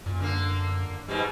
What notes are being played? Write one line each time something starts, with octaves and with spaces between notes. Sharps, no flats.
F#2 A#2
D3 A#3
G#2 B2 G3